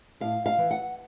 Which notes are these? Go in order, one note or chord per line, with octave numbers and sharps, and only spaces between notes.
A2 F5
F5
E3
F#5